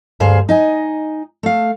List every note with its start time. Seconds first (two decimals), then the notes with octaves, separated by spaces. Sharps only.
0.20 D2 G2 G#4 C5 F5
0.49 D#4 D#5 G#5
1.43 A3 F5